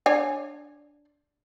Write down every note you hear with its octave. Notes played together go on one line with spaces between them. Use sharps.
D4 C#5 G#5